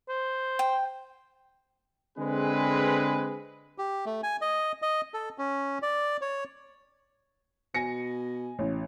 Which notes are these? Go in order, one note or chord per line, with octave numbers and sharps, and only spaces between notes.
C5
G5
D3 G#3 C4 G#4 B4
G4
A3
G#5
D#5
D#5
A4
C#4
D5
C#5
B2 G#5 A#6 C#7
A1